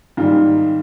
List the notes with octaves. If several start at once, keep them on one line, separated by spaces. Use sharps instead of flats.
G#2 D#3 G3 F4